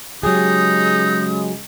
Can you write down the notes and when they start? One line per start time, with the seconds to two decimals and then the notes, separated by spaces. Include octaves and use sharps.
0.23 C#3 F#3 G#3 D#4 G4 G#4 D#6